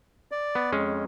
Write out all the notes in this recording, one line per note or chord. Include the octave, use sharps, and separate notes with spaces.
D5
B3
F2 G#3 C#4